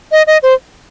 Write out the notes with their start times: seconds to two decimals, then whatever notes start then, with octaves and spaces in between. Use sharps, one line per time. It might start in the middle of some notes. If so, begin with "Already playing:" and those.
0.12 D#5
0.27 D#5
0.43 C5